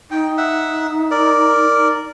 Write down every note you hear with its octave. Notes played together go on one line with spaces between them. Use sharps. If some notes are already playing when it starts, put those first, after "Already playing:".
D#4 G5
E5 F#5
A#4 D5